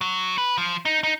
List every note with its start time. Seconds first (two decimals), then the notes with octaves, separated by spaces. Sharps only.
0.01 F#3
0.38 B4
0.58 F3
0.85 D#4
1.03 D#4